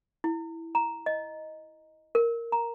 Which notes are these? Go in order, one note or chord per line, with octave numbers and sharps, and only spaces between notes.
E4
A#5
D#5
A#4
A#5